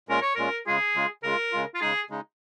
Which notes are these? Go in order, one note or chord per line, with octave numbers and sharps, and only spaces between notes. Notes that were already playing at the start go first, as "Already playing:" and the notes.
A#2 G#3 C#4 F4 A#4
C#5
A#2 G#3 C#4 F4 A#4
C#3 G#3 F4 G#4
C#3 G#3 F4
C#3 G#3 F4 A#4
C#3 G#3 F4
F4
C#3 G#3 D#4 G#4
C#3 G#3 D#4